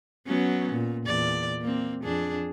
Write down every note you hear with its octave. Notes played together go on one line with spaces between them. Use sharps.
F#3 B3 C#4
A#2
E2 A#2 D5
A#3 C4
F2 D4 G#4